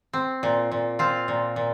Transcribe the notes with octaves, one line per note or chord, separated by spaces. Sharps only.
C4
A#2
A#2
C4 F4
A#2
A#2